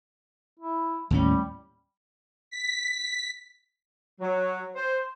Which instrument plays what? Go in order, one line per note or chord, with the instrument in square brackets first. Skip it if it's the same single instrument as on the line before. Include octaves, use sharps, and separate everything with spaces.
[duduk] E4
[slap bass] D#2 A2 C#4 [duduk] G3
[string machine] B6
[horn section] F#3
C5